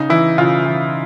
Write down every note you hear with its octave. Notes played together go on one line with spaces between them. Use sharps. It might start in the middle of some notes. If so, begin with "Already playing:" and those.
Already playing: C#3 D#4
E3 E4
C#3 F4
E3